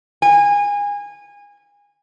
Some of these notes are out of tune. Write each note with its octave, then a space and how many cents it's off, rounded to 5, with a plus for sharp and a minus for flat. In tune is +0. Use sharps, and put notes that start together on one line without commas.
G#5 -25